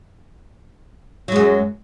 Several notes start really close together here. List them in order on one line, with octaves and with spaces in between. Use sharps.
F#3 G#3 F#2